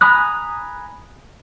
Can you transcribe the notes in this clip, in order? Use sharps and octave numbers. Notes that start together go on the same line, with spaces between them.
G#5 A#5 B5 D#6 F#6